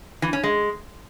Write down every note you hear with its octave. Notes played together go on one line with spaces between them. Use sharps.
E3
C#4
G#3